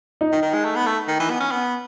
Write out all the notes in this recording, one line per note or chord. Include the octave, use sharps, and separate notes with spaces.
D#4
D#3
D#3
G#3
A3
B3
A3
D#3
E3
B3
C#4
B3